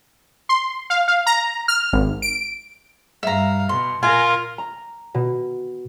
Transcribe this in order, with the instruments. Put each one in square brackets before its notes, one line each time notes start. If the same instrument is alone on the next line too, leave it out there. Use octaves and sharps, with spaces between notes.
[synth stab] C6
F5
F5
A#5
F6
G#1
D7
[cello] G2 F5 [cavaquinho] E5 A#5
[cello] B2 [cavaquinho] C6
[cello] A#2 A#4 [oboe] F4 [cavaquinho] G#5
[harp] A#5
B2